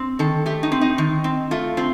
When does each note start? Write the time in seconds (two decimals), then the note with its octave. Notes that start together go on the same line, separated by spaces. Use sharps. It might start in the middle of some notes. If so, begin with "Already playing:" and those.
Already playing: C4
0.19 D#3 A4
0.46 A3 G4
0.63 D#4
0.72 C4
0.81 D#4
0.98 D#3
1.24 C4
1.51 A3 F4
1.77 C4 F4